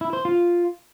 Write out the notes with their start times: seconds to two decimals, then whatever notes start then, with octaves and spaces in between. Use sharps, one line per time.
0.01 E4
0.13 C5
0.25 F4